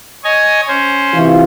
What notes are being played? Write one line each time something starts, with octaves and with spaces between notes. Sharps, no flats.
C#5 D#5 G#5
C#4 C5
C3 E3 F4